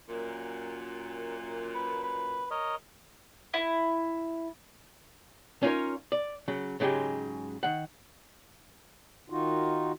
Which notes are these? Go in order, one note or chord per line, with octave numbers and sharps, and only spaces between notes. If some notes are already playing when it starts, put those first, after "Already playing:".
F#2 A#2
B4
B4
A#4 C#5 D#5
E4
C#4 D#4 F4 G4 A#4 C#5
D5
C#3 F#3
G#2 C#3 F#3 G#3 G4
D#3 F#5
D#3 D#4 F4 F#4